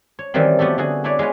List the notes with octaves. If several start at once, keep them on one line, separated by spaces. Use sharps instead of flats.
C#5
D#3 E3 F#3 G3 C4
F3 A3 B3 F#4 G4 A4
D3 F#4 G#4
D4 E4 B4 C#5 D5
G#3 F4 B4 C#5